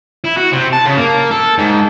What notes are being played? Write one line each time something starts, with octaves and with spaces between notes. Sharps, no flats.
E4
F#4
C3
A5
C#3
A#3
A4
G#2